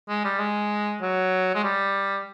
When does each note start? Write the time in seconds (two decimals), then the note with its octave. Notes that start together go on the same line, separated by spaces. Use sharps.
0.09 G#3
0.24 G3
0.40 G#3
1.02 F#3
1.55 G#3
1.64 G3